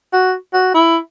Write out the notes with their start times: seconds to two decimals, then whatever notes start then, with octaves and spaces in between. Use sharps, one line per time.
0.13 F#4
0.53 F#4
0.74 E4